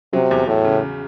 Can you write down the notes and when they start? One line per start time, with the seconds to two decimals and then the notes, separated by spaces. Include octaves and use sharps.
0.13 C3 F#3
0.31 E2
0.47 E2 A2
0.65 C#3